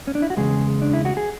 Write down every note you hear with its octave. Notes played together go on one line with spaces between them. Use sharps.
C#4
D4
E4
F#4
E2 C#3 G#3 G#4
D4
E4
F#4
G#4